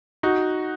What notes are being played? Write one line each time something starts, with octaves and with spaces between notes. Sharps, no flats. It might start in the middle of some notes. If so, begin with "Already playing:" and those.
D#4 F#4